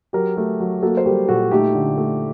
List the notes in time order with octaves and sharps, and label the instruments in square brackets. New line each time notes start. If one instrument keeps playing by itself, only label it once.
[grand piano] F#3 G4 A#4
A3
F#3
A#3 F#4 A4
C5
G3 G4 A#4
A#2 F#4 A4
A3 D#4 G4
D3
A3